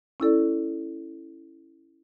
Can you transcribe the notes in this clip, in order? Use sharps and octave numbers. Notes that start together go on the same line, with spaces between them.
C#4 E4 A4 D5